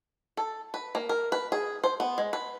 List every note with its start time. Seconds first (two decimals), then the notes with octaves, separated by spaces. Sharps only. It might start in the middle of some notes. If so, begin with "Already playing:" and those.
0.37 A4
0.74 B4
0.95 A#3
1.09 A#4
1.32 B4
1.52 G#4
1.84 C5
2.00 B3
2.18 G#3
2.33 B4